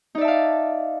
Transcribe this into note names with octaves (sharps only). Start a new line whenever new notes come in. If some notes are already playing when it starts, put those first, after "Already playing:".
D#4 D5 E5 F5 A5